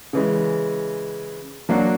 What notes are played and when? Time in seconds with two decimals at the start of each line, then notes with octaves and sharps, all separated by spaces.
0.13 C#3 E3 G#3
1.69 F#3 A#3 D4 F#4